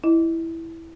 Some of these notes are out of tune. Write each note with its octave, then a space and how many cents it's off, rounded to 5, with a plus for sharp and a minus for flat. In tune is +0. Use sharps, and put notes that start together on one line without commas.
E4 +0 D#5 +0